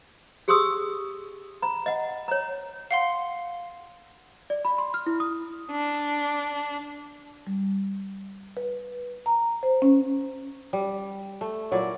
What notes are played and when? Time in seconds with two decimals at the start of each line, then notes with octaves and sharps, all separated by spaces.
0.48 G4 G#4 C6 C#6 D#6 E6
1.62 A#5 B5
1.86 D#5 F#5
2.28 C#5 A#5
2.91 F5 F#5 C6
4.50 D5
4.65 B5
4.78 C6
4.94 F6
5.06 E4
5.20 D#6
5.70 D4
7.47 G3
8.57 B4
9.26 A#5
9.63 C5
9.82 C#4
10.73 G3
11.41 A3
11.71 A#2 F#3 E4 D5